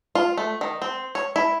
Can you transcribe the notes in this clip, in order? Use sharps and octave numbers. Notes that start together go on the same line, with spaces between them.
F4
A3
D#3
C4
C#5
E4